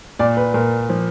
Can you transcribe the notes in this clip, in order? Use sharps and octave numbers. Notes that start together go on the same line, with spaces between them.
A#2 D5
B4
A#2 A#4
F3